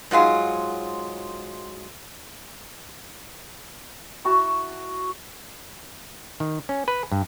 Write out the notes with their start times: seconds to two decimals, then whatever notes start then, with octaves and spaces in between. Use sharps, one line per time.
0.11 G#2 F#3 F4 G#4
4.24 E4 F#4 A5
6.40 D#3
6.69 C#4
6.88 B4
7.12 G2